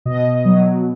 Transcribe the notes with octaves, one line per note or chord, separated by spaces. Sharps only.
B2 D#5
F#3